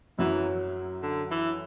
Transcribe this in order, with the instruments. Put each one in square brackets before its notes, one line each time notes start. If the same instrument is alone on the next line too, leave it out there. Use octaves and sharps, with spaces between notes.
[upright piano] F#2 F#3 [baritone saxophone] E3
[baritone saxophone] D3
E3